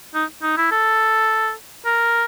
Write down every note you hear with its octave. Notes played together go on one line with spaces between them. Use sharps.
D#4
D#4
E4
A4
A#4